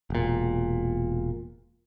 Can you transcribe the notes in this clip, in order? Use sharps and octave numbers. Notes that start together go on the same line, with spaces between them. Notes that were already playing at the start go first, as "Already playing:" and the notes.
E1 A#2